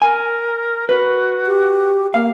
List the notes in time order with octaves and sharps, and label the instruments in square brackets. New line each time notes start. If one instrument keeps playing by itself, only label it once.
[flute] A#4 [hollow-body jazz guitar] G#5
[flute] F#4 [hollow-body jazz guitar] B4
[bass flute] G4
[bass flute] A#3 [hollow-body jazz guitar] F5